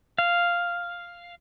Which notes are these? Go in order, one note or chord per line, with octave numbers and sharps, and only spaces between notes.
F5